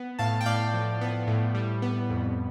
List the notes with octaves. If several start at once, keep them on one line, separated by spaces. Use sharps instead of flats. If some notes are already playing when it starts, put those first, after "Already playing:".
Already playing: B3
A2 F5 A5
G5
A2 D5 F5
F3
B3
A2
G3
B3
F2